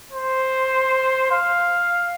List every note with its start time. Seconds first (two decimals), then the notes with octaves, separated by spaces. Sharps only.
0.12 C5
1.32 F5